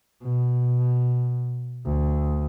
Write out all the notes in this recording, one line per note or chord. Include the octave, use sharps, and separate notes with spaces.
B2
D2